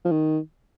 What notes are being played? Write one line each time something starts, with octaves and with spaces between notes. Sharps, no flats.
F3
D#3